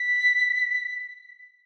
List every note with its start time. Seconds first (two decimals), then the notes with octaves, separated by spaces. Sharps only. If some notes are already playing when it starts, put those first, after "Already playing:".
Already playing: B6